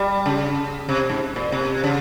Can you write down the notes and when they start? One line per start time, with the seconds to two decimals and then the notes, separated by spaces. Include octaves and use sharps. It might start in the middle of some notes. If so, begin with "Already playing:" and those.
Already playing: G3
0.26 C#3
0.89 C3
1.10 G#2
1.36 A#2
1.52 C3
1.84 C#3